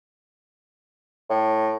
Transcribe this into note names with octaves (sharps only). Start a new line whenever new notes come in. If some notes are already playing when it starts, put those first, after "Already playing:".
A2